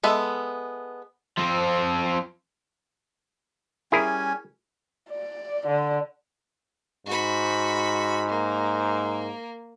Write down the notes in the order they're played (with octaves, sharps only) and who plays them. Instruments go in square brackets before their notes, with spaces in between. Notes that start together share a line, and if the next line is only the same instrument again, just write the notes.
[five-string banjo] G#3 B3 A4 E5
[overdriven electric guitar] F3 C4
[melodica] G3 C#4 G#5 [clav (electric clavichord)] E4 G#4 A#4
[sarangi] D5
D3
[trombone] G#2 [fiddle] F#4 B5
[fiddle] A#3